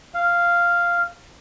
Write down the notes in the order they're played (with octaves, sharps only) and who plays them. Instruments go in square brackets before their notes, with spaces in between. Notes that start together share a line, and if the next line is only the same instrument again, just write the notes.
[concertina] F5